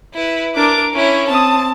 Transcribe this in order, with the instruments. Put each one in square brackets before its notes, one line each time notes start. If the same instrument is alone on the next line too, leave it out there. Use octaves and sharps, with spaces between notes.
[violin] E4 B4
[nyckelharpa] D4 A#4 [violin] D6 D7
[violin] C#4 E4 [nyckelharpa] C#5
[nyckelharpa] C4 D#6 [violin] A5